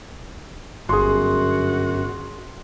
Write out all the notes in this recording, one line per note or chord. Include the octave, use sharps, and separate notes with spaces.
G1 F#2 F#4 G#4 C6